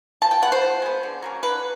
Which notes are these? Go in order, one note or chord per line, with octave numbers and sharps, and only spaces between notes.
F3 A5
G5
G#3 B3 F#5
C5
F3
G#3 B3
D3
F#3 A#3 C#4
D3 B4